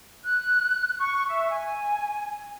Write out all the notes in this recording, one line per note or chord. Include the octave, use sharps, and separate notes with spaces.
F#6
C#6
E5
G#5